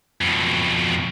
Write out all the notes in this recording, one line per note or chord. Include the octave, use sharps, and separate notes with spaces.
F2 B2